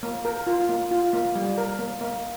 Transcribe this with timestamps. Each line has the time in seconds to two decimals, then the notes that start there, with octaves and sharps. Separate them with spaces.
0.03 A#3
0.25 A#4
0.47 F4
0.69 A#3
0.91 F4
1.13 A#3
1.35 G3
1.58 A#4
1.79 A#3
2.01 A#3